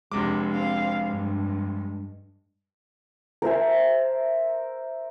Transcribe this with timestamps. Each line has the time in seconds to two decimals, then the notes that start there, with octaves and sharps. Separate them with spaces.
0.12 F1 C3 G#3 D4 D6
0.52 C4 F5
1.06 G2
3.42 A#4 C5 E5 G#5